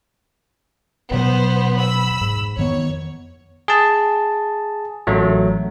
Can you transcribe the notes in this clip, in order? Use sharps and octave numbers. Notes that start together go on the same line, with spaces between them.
D#1 B2 F#3 B3 C5
B5 E6
G#2
F2 D#3 B3 C#5
G#4 A5
A1 F#3 A3